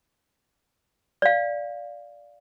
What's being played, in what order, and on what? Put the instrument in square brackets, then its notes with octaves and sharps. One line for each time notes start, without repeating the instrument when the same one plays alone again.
[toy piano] D5 F5